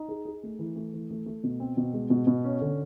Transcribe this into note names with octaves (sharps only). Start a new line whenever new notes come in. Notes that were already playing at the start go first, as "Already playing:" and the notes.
Already playing: D#4
G#4
G#4
A3
E3
A3
E3
A3
A3
B2
C4
B2
G#3
B2
B2
C#4
D3